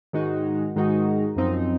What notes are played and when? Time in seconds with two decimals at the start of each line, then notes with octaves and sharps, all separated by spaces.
0.13 G#2 D#3 G#3 D#4 F#4
0.76 G#2 D#3 G#3 D#4 F#4
1.36 F#2 F3 C4 D#4